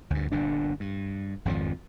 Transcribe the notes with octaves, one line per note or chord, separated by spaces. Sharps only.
D2 G2
G1 G2 A#2 D4
G2
G#1 F2 D#3 F3